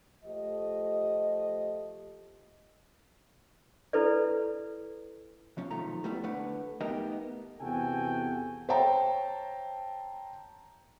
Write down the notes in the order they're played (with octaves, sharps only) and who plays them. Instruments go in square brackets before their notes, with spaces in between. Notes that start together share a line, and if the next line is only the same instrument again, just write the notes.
[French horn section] F3 A3 G4 D#5
[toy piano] E4 A4 B4 D5
[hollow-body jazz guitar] C3 F3 C#4
B1 D#3 F3 A3 A#5
G3 A3 B3 E4
D3 A3 B4 F#5
A3 B3 D#4 G4 A#4 D#5
[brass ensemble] E2 C3 F#4 A4 G5 G#5
[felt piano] C5 C#5 E5 G5 A5 A#5